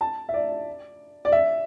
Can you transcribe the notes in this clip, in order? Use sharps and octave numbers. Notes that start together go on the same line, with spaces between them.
A5
E5
D5
D5
E5